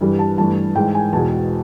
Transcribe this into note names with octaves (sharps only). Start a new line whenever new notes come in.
G2 E3 G3
A5
G2 E3 A3 A5
G#2 E3 G#3 G5
G#5
E2 B2 G#3 A5